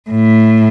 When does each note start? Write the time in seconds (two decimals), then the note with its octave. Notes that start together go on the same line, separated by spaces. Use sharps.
0.10 A2